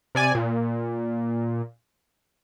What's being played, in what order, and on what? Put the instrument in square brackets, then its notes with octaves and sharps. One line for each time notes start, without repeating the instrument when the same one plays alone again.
[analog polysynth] C3 D5 G#5
A#2